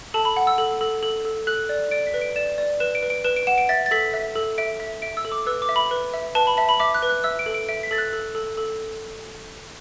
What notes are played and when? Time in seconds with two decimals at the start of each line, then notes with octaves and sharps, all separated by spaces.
0.14 A4 A5
0.25 B5
0.37 F#5
0.47 E6
0.58 A4
0.81 A4
1.03 A4
1.25 A4
1.47 A4 F#6
1.69 D5
1.91 D5 D7
2.07 B6
2.14 B4
2.21 D7
2.36 D5 E7
2.58 D5
2.80 B4 E7
2.95 D7
3.03 B4
3.10 D7
3.24 B4 E7
3.36 D7
3.47 F#5 E7
3.58 D7
3.69 E5 A6
3.86 A6
3.91 A4 B6
4.14 E5
4.35 A4
4.58 E5 D7
4.80 E5
5.02 E5 D7
5.17 E6
5.25 A4
5.32 D6
5.47 B4 E6
5.62 D6
5.69 E5
5.76 B5
5.91 B4
6.14 E5
6.35 B4 A5
6.47 B5
6.57 E5 A5
6.69 B5
6.80 E5 D6
6.95 F#6
7.03 B4
7.09 F#6
7.24 E5 E6
7.39 D7
7.46 A4
7.54 D7
7.69 E5 D7
7.83 B6
7.91 A4 A6
7.98 F#6
8.13 A4
8.35 A4
8.57 A4